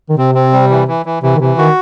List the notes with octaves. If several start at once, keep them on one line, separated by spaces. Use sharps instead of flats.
D#3
C3 C4
C4
G3
E3
E3
E3
C3 E3
D#3
C3 E3
D#3 F#4